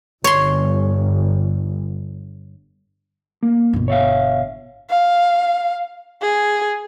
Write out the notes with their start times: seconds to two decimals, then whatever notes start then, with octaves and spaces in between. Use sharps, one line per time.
0.24 G1 C#5 C6
3.43 A#3
3.73 G1 B2
3.88 C#5 E5 F5
4.90 F5
6.22 G#4